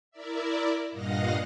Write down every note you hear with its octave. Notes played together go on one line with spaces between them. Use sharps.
E4 A#4 D5 E5
G2 A#2 D#5 F5 F#5 A#6